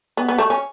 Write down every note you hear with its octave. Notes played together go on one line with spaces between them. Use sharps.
B3
B3
A3
C#4